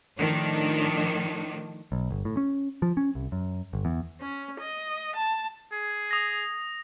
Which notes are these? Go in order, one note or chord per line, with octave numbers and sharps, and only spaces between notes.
A2 D#3 F3 D4
B1
G1
A2
C#4
F3
C#4
C2
F#2
G1
E2
C#4
D#5
A5
G#4
D#6 A#6